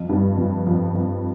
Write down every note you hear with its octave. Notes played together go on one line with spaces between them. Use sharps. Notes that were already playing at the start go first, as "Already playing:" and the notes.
Already playing: F2 F3
G2 G3
F2 F3
F2 F3
F2 F3